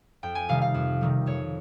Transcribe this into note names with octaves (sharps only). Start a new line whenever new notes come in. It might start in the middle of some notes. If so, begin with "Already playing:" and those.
F2 G5
G#5
C3 D#3 G3 F5
F5
F2
C3 D#3 G3
F2 C#5